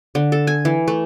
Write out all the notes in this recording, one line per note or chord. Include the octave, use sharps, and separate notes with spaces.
D3
A4
G#5
E3
A3